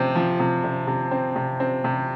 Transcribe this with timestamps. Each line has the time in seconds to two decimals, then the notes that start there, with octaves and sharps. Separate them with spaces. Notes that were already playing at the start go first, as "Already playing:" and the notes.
Already playing: C3 F3 C4
0.16 F3
0.40 C3
0.64 C3
0.87 C3
1.11 C4
1.36 C3
1.60 C4
1.84 C3